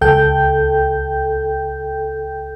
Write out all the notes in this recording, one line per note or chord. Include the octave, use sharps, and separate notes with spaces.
C#2 A4 G5 G6